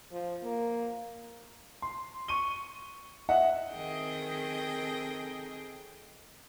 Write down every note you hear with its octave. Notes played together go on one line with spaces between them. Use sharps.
F3
A#3
C6
C#6 D#7 G7
D#5 E5 F#5
D#3 C4 G#4 A4 D#5 G5